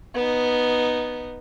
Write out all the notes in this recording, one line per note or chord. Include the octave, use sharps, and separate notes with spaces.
B3 D#4